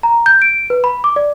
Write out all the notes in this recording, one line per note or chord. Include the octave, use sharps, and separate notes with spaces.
A#5
G6
D7
B4
B5
D6
D5